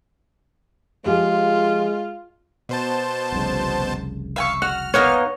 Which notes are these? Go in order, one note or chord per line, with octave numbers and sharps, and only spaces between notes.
F3 G#3 F4 G4 G#4
B2 C5 A5
F1 C2 C#3
E5 F5 G#5 C#6
F#4 F#5 F6
A#3 B3 D#4 C#5